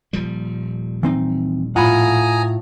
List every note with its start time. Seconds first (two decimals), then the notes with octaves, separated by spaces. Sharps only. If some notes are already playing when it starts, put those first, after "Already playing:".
0.13 D#1 F3 G3
1.03 E3 C4 D#4
1.76 A2 F4 F#5 G#5 A#5 B5 D#6